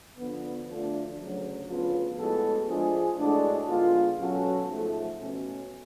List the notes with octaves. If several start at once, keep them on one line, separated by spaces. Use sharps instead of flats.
D3 F3 B3
D2 D3 F3 A3 D4
D2 C#3 F#3
D2 C#3 F3 B3 F4
A2 G#3 B3 F#4 A4
F3 G#3 D4 G#4
A2 G#3 D4 F#4 A4
D3 G#3 B3 F4
B2 F#3 C#4 F#4 A4
G#2 F3 A3
B2 A3 C#4